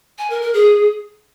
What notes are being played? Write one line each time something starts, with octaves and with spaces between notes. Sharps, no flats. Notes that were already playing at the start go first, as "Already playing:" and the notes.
G#5
A#4
A#4
G#4